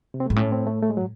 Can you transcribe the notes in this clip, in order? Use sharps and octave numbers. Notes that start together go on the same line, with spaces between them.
C3
C4
G#2 A3
A2 C#4
C4
A3
A3
G#3
F#3